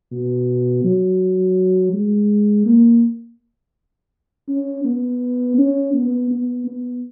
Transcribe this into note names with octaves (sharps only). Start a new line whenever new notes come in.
B2
F#3
G#3
A#3
C#4
B3
C#4
B3
B3
B3